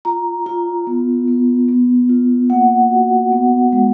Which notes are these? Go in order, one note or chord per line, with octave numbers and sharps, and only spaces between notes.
F4 A#5
F4
B3
B3
B3
F4
A#3 F#5
F#4
B3
G#3